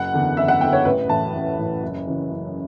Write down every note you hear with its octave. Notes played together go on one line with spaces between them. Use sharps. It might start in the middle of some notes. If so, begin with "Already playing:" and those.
Already playing: F#1 F#5
E2 D3
F#1 E5
F#5
E2 D3 G5
C#5
A1 B4
A2 E3 A5
A1
A2 E3
F#1
F#2 C#3 E3
F#1